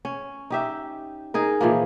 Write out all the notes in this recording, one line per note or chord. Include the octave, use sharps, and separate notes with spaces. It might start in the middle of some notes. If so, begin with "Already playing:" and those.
C#4
D#4 G4 E5
D#4 G#4 A#4
A#2 E3 F3 A#3